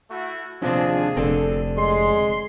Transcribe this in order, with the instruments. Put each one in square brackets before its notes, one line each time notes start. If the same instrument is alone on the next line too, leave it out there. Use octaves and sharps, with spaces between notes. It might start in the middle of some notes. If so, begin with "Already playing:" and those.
[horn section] A3 E4 F#4
[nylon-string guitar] D#2 C3 C4 [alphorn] F3 [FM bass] D4 [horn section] G#4
[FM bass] F1 [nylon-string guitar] D3 C4 [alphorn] A4
[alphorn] G#3 [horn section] C6